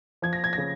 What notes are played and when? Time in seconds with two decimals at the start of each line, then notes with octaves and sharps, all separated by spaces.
0.22 F3 G#6
0.33 A#6
0.44 G#6
0.53 C#3 A#6